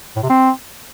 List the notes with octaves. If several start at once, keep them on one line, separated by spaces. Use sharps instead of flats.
A2
C3
C4